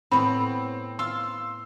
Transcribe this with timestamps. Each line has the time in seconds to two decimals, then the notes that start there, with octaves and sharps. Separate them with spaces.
0.11 A2 B3 C4 B5
0.99 F4 C6 E6